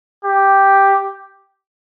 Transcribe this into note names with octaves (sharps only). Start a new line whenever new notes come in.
G4